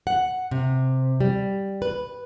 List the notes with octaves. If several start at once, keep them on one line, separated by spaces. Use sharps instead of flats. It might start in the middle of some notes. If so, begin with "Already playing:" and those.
F#5
C3
G3
B4